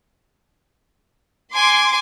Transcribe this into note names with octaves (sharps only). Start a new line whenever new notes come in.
G#5 C6 D6